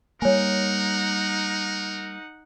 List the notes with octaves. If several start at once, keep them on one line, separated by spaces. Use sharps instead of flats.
G3 A#3 D#4 A#4 C#5 F#5 G#5